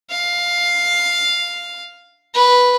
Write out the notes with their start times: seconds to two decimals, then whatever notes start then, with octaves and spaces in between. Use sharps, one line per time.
0.10 F5
2.34 B4